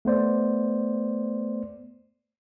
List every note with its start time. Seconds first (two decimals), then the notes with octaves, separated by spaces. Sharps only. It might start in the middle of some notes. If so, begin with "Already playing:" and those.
0.05 A3 B3 C5 D5